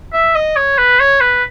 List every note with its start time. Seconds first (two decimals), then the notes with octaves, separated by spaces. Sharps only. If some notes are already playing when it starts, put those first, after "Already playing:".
0.13 E5
0.35 D#5
0.56 C#5
0.78 B4
1.00 C#5
1.21 B4